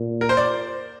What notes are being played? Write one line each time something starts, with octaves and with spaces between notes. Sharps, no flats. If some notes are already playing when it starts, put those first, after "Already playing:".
Already playing: A#2
A#4
C5
D5